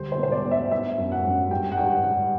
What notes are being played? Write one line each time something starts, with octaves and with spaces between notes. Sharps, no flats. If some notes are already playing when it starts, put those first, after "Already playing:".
Already playing: D2 G3 C5
C5
B2
C5
D5
B3
E5
B3 E5
F#2
F#5
F#2
G2 G5
F#5
G2 G5
G3 F#5